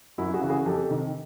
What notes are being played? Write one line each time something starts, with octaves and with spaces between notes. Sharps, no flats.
F#2 E4 F#4
F#4 G#4
C#3 E3
F#4 G#4
F2 G4 A4
C3 D#3